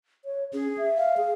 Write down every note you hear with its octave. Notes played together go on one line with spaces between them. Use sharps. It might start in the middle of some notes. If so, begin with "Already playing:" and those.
C#5
C#4 G#4
E5
F5
G#4